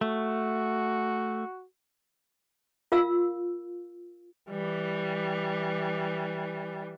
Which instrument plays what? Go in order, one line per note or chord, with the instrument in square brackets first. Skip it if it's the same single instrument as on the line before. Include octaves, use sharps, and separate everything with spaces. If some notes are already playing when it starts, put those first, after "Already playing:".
[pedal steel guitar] A3 [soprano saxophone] F#4
[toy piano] F4 A#4 F5 E6
[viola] E3 G3